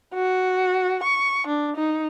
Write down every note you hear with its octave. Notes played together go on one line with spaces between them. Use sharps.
F#4
C#6
D4
D#4